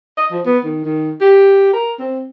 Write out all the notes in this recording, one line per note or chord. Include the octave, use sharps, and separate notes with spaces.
D#5
F3
B3
D#3
D#3
G4
A#4
C4